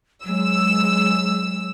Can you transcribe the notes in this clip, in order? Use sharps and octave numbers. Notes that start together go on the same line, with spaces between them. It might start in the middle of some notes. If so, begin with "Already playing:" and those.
F#3 G#3 E6